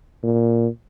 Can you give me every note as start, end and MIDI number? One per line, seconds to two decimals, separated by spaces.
0.23 0.67 46